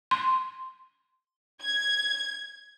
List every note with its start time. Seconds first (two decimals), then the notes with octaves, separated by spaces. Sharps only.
0.11 C6
1.61 G#6